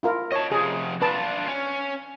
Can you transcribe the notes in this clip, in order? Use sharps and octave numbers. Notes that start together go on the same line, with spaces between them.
E4 F4 A#4
C#5 D#5 A5
C3 F3 G#4
D4 F4 B4 A5
C#4